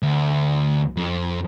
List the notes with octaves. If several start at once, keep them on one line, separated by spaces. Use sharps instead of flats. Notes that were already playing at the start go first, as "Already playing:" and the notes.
D2
F2